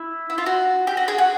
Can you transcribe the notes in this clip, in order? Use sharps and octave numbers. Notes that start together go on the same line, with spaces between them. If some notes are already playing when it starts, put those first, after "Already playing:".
Already playing: E4
E4
F4
F#4
G4
F#4
G#4
F#4